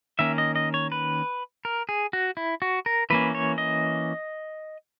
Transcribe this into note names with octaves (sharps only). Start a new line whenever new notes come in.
D#3 A#3 C#4 E5
D#5
D#5
C#5
B4
A#4
G#4
F#4
E4
F#4
A#4
E3 A#3 C#4 B4
C#5
D#5